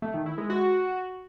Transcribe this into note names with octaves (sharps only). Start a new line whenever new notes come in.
A3
D#3
E4
G#3
F#4